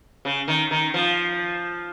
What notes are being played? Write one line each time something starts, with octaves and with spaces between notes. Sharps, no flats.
C#3
D#3
D#3
F3